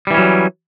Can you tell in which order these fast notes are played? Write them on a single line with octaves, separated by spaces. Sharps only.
G3 E3 C#4 F#3